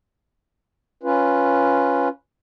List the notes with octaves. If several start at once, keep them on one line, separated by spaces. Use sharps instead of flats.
C#4 F4 B4